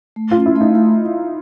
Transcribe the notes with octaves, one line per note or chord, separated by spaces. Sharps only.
A3
F4
C#4
E4
A3
D#4
A3